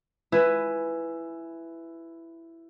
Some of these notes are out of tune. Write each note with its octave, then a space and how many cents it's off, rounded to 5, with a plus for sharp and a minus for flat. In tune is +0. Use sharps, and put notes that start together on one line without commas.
E4 +10 B4 +5 G#5 +5